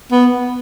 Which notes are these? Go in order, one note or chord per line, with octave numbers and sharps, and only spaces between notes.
B3